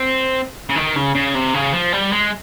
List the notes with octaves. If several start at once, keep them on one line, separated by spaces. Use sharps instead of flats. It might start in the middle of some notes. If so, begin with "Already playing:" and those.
Already playing: C4
C#3
D#3
C#3
C#3
C3
C#3
F3
G3
G#3